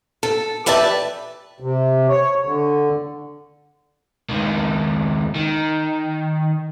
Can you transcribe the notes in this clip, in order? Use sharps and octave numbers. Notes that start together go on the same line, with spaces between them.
A4
G4 B4 D5 E5 A5
C3
C#5
D3
C#2 D#3
D#3